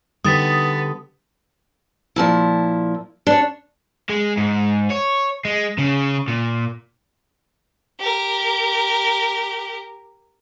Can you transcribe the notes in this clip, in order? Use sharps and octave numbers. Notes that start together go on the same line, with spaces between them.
D3 G3 B3 D#4 G4 D#6 A6 B6
A#2 F3 E4
D4 C#5
G#3
G#2
C#5
G#3
C#3
A#2
G4 A#4